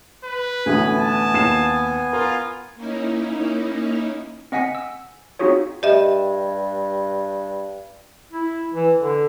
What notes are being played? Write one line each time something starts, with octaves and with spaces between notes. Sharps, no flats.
B4
A1 D2 B3 G#5
A5
D#2 C7 E7
F4 A#4
A#3 C#4 D#4 E4
C4 D#5 F#5 G#5 B6 C#7
E6
C4 D#4 F4 F#4 G#4 C#5
G2 G4 D#5 E5
E4
E3
D3